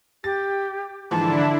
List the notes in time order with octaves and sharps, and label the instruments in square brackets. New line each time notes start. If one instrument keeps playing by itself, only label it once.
[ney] G4 [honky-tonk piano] A6
[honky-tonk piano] G#2 E3 F3 [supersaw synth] D3 D4 E4 [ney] A5